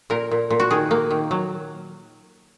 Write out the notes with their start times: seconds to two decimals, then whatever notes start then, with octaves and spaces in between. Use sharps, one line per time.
0.10 A#2 A#4
0.31 A#2
0.50 A#2
0.60 F#4
0.71 D#3 G#4
0.91 A#3
1.11 D#3
1.31 F#3